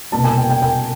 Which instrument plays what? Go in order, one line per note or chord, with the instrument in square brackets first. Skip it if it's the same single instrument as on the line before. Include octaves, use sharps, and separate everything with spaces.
[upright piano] C2 B2 G3 A#3 A5
G#5
G5
G5
G5